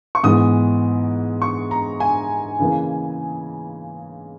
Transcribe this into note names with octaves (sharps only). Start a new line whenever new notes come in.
C#6
G#2 E3 G#3 B3 D#6
C#6
A#5
G#5
C#3 E3 A#3